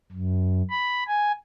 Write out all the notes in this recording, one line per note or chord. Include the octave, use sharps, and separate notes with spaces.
F#2
B5
G#5